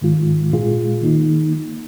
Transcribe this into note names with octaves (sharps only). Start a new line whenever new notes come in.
G#2 D#3 G#3 F4
C2 A#2 G#3 F4 G#4
D#3 A#3 D#4